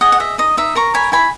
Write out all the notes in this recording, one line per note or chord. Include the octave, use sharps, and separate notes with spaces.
G#4 D#5 F#5
F#5
D#5 E5
D#4 D#5
D#4 E5
A#4 A#5 C#6
C#5 G#5 B5
E4 G#5 B5